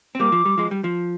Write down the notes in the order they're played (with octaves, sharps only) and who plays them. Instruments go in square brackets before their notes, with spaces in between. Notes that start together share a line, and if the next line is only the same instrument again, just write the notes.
[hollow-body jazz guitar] C4
[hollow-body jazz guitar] G3 A#3 [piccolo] D6
[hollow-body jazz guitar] F3
G3
F3 G#3
G3
F3